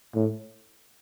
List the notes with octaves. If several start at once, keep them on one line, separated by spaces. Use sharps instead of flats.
A2